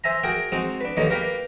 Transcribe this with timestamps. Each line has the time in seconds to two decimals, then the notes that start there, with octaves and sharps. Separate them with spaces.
0.04 C5 E5 G#5 A#5
0.24 F#4 G#4 A#4 G5
0.52 G#3 C4 D#4 F#4
0.81 D4 B4
0.97 D#2 D3 G#3 A#3 D#4 C#5
1.10 A#3 G4 A#4 B4